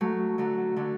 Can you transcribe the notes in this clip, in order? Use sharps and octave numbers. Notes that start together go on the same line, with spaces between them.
F#3 A3
D3 F#3
D3 F#3